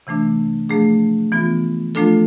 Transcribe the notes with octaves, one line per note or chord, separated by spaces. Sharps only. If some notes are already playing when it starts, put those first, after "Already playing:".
C3 E3 A3 D4
F3 A3 D4 G#4
E3 B3 F4
F3 A3 D4 F4 A4